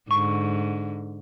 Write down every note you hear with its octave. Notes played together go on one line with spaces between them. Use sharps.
G#2 D3 C#6